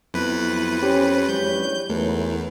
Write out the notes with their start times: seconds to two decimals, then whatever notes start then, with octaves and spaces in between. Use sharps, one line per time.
0.14 F2 F#3 B3 E4 B4
0.83 C#4 G4 C5
1.29 E2 G2 F#3 G#3 C#5 G6
1.90 E2 G#2 E3 F#3 A3 E4 A#4 B4